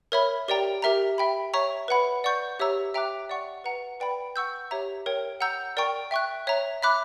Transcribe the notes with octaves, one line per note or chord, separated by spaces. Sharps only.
A#4 C#5 E5 B5
G4 A#4 D5 G5 A#5
G4 A#4 E5 A#5
E5 G5 B5
C#5 E5 A#5 C#6
B4 F#5 B5
D5 F#5 C#6 G6
G4 C#5 E5 A#5 E6
E5 G5 A#5 D6 F#6
D5 F#5 C#6
B4 F#5 A#5
B4 D5 G5 B5
F#5 C#6 E6 G6
G4 C#5 E5 A#5
A#4 C#5 G5
F#5 A#5 E6 G6
A#4 D5 G5 A#5 C#6
E5 G5 C#6 F#6
C#5 E5 A#5
E5 B5 D6 F#6